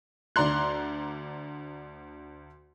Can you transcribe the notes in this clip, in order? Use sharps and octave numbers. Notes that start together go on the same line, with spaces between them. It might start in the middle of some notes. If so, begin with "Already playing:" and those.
D2 D5 A#5 C6 F#6